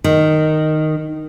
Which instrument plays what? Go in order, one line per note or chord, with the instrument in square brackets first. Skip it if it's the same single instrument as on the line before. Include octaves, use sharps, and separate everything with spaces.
[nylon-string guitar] D#3